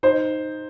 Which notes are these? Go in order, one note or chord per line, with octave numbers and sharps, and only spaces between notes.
D#4 C5